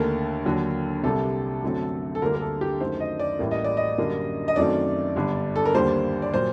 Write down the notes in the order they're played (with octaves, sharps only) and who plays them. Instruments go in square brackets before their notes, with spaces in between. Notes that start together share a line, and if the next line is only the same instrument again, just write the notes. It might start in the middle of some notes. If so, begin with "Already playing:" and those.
Already playing: [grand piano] D#2 D3 A3 A#4
D#2 D3 F#3
C2 C3 G3 A4
F#2 D3 F#3 A3 C4
A4
D2 D3 G3 A#3 A#4
A#4
A4
G4
F#2 D#3 A3 C5
D#5
D5
A1 A2 G3 A#3
D#5
D5
D#5
F#2 D3 G3 A#3
D#5
F#2 D#3 F#3 A3 C4 D5
G1 G2 D3
A4
A#4
D#2 D3 G3 A#3 C5
D5
A#2 F#3 C5